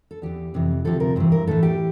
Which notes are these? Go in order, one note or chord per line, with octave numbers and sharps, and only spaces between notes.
A4
E2 E3 G4
F2 C3 E3
D2 C3 F3 A4
A#4
G2 E3 C5
A#4
A2 E3 A4
G4